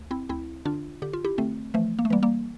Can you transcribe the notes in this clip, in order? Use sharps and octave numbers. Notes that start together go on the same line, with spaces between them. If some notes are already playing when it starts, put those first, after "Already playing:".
Already playing: D2
C4 E4
D2 C4 E4
D3 D4 F4
D3 G4
F4
E4 G4
D3 A3 C4
E3 F3 A3
A#3
A3
E3 G3 A#3
G3 A#3